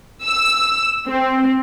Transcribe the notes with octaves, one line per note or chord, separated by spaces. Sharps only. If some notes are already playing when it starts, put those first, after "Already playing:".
E6
C4